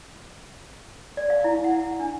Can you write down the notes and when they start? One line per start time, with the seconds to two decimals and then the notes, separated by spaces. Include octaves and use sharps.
1.17 D5
1.30 F5
1.44 E4
1.64 F#5
2.00 D4